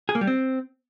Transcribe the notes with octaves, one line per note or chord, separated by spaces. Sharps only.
G#4
A#3
G3
C4